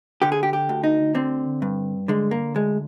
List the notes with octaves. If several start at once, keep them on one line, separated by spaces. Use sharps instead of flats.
D3 G4
G#4
G4
G4
D2
D#4
D3 C4
G2
D3 G#3
A#3
D2 G#3